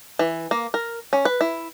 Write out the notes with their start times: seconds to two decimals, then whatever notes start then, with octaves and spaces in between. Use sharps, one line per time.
0.19 E3
0.51 A#3
0.74 A#4
1.13 C#4
1.25 B4
1.41 E4